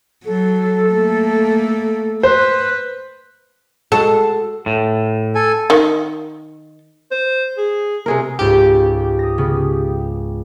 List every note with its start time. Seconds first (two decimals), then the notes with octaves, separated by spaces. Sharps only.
0.25 F#3 A4
0.92 A3 A#3
2.23 B4 C5 F#6
3.92 G#3 F#4 A4 A5
4.66 A2
5.35 A4 G#5
5.70 D#3
7.11 C5
7.57 G#4
8.06 C3 G#4 A#4
8.39 C#2 G#2 A#3 G4
9.19 D#6 A#6
9.38 C#3 B3